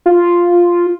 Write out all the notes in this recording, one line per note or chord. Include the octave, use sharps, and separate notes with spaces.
F4